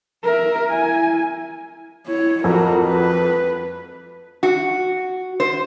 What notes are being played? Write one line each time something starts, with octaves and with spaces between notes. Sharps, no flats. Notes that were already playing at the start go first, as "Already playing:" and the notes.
A#4 E5
E4 G#5
E4 C#5
F2 F#4 A#4
B4
F#4
C5